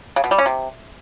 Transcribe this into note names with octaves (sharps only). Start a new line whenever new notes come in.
C#3
B2
G3
C#4
C3